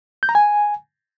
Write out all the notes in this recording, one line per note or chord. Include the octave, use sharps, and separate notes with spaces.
G6
A#5
G#5